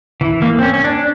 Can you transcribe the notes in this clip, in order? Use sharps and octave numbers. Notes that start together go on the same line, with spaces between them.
E3
A#3
C4
C#4
C#4
D4